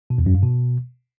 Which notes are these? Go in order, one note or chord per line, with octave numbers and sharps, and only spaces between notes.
B2
E2
F#2
G2
B2